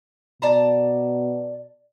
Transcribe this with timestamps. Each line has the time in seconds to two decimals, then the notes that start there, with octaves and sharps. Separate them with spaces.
0.42 B2 D5 A5 A#5